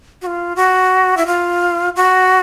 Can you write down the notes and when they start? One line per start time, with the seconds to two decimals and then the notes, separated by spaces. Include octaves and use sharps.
0.22 F#4
0.27 F4
0.56 F#4
1.17 E4
1.26 F4
1.96 F#4